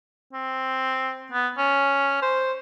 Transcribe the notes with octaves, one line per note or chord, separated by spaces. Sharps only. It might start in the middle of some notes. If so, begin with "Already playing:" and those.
C4
B3
C#4
C5